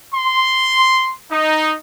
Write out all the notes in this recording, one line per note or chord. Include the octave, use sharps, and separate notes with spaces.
C6
D#4